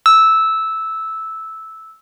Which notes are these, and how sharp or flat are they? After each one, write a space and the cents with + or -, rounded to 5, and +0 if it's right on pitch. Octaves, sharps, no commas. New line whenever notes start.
E6 -10